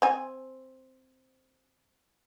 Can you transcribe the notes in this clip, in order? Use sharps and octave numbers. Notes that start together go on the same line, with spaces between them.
C4 G#5